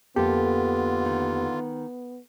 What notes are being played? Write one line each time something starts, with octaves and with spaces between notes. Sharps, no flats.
F2 D3 A#3 B3 F4 G4 A4
D#3